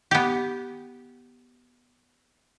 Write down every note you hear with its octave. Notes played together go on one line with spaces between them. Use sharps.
B3 G4